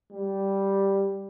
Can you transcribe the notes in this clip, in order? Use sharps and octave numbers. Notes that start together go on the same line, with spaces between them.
G3